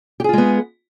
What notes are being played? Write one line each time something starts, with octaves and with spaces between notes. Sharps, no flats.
G#3 B3 F4 G4 G#4